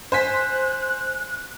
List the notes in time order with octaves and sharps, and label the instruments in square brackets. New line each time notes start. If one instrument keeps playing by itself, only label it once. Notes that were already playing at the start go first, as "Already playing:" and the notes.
[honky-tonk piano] C5 G#5 B6 [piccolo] F#6